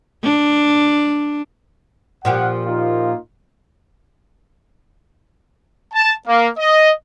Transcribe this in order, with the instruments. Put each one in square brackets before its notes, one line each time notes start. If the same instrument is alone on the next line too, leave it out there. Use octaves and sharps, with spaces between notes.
[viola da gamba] D4
[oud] A#2 F3 G4 [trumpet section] F#5
[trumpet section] A#3 D#4 F4
A5
A#3
D#5